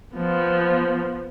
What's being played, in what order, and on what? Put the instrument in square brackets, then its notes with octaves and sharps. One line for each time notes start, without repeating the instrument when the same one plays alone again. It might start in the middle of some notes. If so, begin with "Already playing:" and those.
[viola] F3 B3